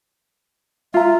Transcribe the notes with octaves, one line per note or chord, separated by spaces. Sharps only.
F4 E5 A#5